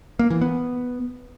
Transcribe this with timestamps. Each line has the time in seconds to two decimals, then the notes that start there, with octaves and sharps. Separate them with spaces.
0.19 A#3
0.30 E3
0.41 B3